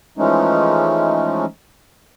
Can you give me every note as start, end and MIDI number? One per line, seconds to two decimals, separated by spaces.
0.18 1.45 52
0.18 1.45 53
0.18 1.45 56
0.18 1.45 57
0.18 1.45 61
0.18 1.45 63